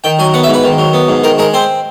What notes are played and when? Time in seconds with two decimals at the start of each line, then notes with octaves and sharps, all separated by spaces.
0.04 D#3 G5
0.19 F#3 G#5
0.34 B3 F#5
0.43 E5
0.48 G#2
0.54 B4
0.64 D#3
0.78 F#3
0.93 B3
1.08 G#2
1.23 D#3 A#4
1.38 G#3 A#4
1.54 C4 C5